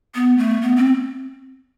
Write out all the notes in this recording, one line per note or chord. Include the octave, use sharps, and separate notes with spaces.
B3
A3
B3
C4